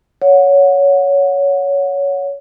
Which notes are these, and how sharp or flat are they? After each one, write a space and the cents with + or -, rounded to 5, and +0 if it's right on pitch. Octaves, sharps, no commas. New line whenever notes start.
C#5 +15 F#5 -20